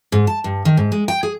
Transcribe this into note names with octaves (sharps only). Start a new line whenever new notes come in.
G#2
A5
G2
D#3
G#2
G#3
G5
G#4